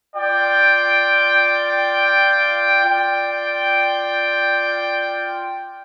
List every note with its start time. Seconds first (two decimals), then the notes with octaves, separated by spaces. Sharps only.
0.16 F4 D5 G5
2.85 F4 D5 G5